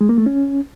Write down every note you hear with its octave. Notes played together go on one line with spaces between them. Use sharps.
G#3
A#3
A3
C#4